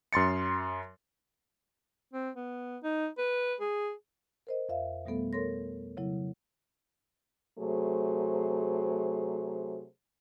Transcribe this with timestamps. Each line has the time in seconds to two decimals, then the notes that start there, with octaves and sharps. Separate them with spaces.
0.13 F#2 C6 A6 C#7
2.13 C4
2.36 B3
2.83 D#4
3.18 B4
3.60 G#4
4.47 A#4 C5 D#5
4.69 F2 E5 F5
5.06 B2 G3 A3 B3 A4
5.33 A4 A#4 C#5 C6 A#6
5.97 C#3 F#3 E4
7.58 C3 F#3 A3 G#4 C5